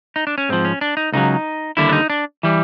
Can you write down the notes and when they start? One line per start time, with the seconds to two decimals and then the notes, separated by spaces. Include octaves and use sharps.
0.16 D#4
0.27 D4
0.38 C#4
0.49 G#2 F3 C4
0.65 C#4
0.81 D4
0.97 D#4
1.12 C#2 C#3 F#3 D#4
1.77 D#2 D3 G3 E4
1.89 D4
1.93 D#4
2.10 D4
2.43 E3 G3